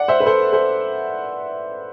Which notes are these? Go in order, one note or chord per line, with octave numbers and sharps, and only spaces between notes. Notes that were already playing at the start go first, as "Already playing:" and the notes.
Already playing: D5 F#5
C5 E5
B4
A4 C5
A4 C5